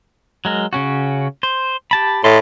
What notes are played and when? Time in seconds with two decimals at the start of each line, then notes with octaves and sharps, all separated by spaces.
0.45 F#3 G#3 A#4
0.73 C#3 C#4 F#4
1.43 C5
1.91 G4 A5 B5
2.24 A2 D#5 A5 C6